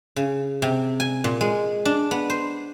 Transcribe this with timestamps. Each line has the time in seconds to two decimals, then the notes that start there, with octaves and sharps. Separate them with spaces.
0.16 C#3
0.62 C3
1.00 G#5
1.24 A#2
1.41 G#3
1.85 D4
2.11 B3
2.30 C5